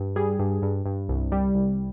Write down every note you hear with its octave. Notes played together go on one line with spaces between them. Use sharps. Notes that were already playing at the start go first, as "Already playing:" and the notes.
Already playing: G2
G3 G#4
G2
G2
G2
C2
G3
C2